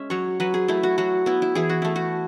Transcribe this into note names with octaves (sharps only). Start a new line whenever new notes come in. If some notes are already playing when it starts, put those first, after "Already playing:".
Already playing: G#3 C#4 E5
F#3 C#5
F#3 B4
G#4
A3 E4
F#4
F#3 F#4
B3 E4
E4
E3 G#4
F#4
A3 E4
F#4